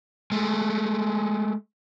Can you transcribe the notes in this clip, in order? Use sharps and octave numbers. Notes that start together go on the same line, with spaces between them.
G#3 A3